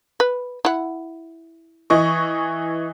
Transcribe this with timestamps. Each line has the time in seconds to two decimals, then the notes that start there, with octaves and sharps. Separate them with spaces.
0.20 B4
0.65 E4 F#5
1.90 E3 D#5 C#6